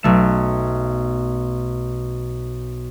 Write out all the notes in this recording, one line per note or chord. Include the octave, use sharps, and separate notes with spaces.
B1 A3 E7